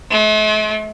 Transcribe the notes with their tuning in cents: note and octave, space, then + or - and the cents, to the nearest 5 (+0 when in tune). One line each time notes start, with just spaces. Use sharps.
A3 -45